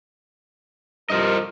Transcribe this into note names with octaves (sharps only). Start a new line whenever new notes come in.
C2 G2 F4 A#4 C5 D#5